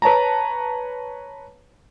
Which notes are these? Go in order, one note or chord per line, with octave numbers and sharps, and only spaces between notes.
B4 C#5 A5 A#5